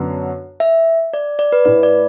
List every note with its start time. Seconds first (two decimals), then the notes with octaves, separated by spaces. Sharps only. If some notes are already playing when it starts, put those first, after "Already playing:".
Already playing: F#2 D3 B3 D4 F#4 F#5
0.60 E5
1.13 D5
1.39 D5
1.52 B4
1.65 A2 A3 E4 B4
1.83 D5